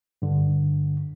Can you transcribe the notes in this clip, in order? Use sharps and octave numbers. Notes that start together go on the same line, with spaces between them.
G2 D3